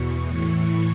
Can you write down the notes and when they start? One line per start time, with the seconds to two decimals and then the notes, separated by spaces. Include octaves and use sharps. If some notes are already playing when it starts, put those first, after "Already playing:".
Already playing: E2 B2 C#6
0.26 A2 E3 C#6